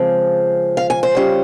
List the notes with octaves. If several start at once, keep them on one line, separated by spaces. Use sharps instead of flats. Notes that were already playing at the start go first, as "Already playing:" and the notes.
Already playing: C#3 F3 G#3 C4
F5
G#5
C5
C#3 G3 C#4 F4